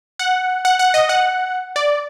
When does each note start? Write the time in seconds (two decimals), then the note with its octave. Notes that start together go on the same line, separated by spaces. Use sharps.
0.19 F#5
0.65 F#5
0.79 F#5
0.94 D#5
1.09 F#5
1.76 D5